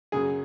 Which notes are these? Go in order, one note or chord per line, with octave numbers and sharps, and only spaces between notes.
F#2 C#3 F#3 G#4